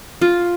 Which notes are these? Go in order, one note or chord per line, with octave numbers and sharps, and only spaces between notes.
F4